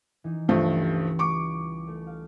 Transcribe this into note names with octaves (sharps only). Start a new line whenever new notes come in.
E3 D#4
C#2 G2 F3 G3 A3
C#6 D6
A3
F5